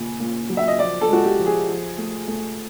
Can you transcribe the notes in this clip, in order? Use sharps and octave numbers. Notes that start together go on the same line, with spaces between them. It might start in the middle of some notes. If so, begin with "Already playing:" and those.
Already playing: A#2 C#3
A#2
F#3
E5
D#5
F3 D5
A4
G#3 F#4
G4
F3
G#4
F3
A3
A3